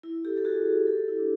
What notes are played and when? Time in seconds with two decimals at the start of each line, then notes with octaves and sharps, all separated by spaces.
0.03 E4
0.25 G4 A4
0.37 A4
0.45 F#4 G#4
0.87 G4 A4
1.08 E4
1.19 D4